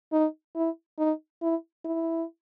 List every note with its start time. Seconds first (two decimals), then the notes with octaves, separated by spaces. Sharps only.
0.12 D#4
0.56 E4
0.98 D#4
1.42 E4
1.85 E4